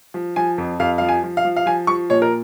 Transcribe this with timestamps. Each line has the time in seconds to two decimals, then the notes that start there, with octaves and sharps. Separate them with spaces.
0.14 F3
0.36 F3 G#5
0.58 F2
0.80 F2 F5
0.98 F3 F5
1.09 G#5
1.23 F3
1.37 F5
1.45 F3
1.56 F5
1.66 F3 G#5
1.87 F3 C#6
2.10 A#2 C#5
2.22 A#4